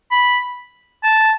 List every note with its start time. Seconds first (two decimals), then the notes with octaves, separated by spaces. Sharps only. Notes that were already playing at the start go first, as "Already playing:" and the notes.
0.11 B5
1.03 A5